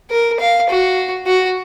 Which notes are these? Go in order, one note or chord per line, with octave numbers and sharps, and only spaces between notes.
A#4
F5
F#4
F#4